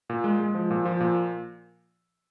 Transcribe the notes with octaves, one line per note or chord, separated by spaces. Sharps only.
A#2
G#3
G#3
F3
A#2
F3
A#2